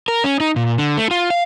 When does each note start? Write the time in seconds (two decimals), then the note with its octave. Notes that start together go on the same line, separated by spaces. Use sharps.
0.08 A#4
0.24 C#4
0.40 D#4
0.56 A#2
0.78 D3
0.97 A3
1.11 F4
1.30 F5